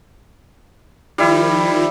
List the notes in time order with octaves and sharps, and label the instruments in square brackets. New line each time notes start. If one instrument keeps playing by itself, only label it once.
[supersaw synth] D#3 F3 [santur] G3 E4